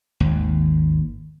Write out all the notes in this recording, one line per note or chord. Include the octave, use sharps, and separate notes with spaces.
G#1 D#2